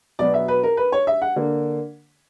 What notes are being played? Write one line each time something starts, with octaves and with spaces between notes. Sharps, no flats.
B2 F#3 B3 D5
E5
B4
A#4
B4
C#5
E5
F#5
D3 A#3